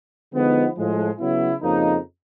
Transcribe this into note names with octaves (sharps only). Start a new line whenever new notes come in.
D3 F3 G#3 B3 D#4
A2 F3 G#3
C#3 F#3 B3 E4
F2 C#3 F3 A#3 D#4